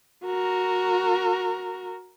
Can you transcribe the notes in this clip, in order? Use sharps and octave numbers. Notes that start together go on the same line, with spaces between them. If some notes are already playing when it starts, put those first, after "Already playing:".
F#4 A#4